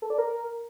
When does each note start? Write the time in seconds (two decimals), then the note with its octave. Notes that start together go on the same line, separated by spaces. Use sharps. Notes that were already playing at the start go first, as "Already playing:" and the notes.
0.02 A4
0.10 D5
0.18 A#4